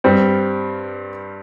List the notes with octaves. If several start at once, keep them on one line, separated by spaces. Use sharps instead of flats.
G2 G3 C4